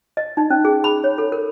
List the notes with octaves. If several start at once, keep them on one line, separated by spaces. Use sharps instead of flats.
D#5
D#4
C#4
G#4
B5
C#5
A4
A#4